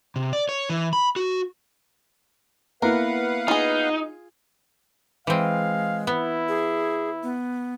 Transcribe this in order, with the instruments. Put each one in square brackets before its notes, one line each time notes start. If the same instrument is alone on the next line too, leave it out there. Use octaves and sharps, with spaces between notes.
[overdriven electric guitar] C3
D5
C#5
E3
B5
F#4
[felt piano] A#3 B3 E4 [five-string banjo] A#4 [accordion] B4 F5 F#5
[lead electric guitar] D#4 [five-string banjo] F4 G#4
[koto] E3 C4 [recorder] G#3 [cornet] F5
[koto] B3 [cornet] E4
[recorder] G#4
B3